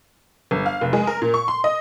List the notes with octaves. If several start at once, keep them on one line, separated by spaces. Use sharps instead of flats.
G1
F5
F1
G#3
A#4
A#2
C#6
C6
D#5